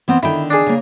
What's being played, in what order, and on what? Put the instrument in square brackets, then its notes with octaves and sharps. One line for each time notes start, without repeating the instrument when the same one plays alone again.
[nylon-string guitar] E3 B3 C4
[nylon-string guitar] D3 D#3 G5 [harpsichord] E4
[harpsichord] D4 G#4
[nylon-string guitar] C#3 A#3